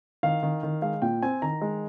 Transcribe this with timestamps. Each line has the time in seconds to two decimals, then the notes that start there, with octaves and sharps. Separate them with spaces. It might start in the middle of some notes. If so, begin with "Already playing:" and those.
0.23 D#3 F5
0.43 D#3
0.63 D#3
0.82 G#3 F5
1.02 A#2 G5
1.22 C4 G#5
1.42 D#3 A#5
1.61 G#3